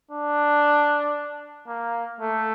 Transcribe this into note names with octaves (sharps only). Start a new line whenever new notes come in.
D4
A#3
A3